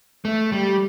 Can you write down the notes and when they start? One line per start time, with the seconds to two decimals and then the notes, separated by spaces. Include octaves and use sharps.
0.25 A3
0.52 G3